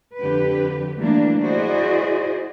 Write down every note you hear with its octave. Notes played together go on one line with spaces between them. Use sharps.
F2 D3 G4 B4
E3 G3 A3 A#3 D4
E4 F#4 G#4 C5 D5 D#5